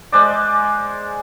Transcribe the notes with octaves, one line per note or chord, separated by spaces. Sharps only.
G#3 C5 D5